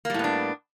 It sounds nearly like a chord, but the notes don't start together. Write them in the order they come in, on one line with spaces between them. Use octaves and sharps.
A#3 G3 A2 B3 D4